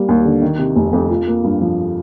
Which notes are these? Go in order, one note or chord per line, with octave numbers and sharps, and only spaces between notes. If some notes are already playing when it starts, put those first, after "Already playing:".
Already playing: G3 A#3
D#2
D3
D#3
C3
F1
F2
F4
A#3
G2
F3